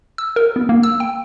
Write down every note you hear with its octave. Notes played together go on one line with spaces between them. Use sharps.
E6
A#4
B3
A#3
E6
G5